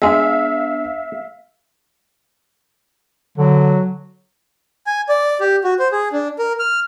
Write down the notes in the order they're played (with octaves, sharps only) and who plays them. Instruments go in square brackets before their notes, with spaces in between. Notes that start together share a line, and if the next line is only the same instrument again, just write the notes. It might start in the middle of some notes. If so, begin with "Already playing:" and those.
[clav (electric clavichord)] G#3 G#4 [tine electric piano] B3 D4 [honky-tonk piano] E5 F5
[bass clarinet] D3 [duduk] F#3
[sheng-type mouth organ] G#5
D5
G4
F#4
C5
G#4
D4
A#4
F6